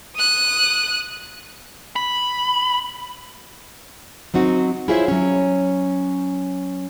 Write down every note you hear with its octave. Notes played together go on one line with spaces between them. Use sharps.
D#6 F#6
B5
F#3 C4 D#4 F#4
E4 F4 G#4 C5 C#5 E5
F#3 C#4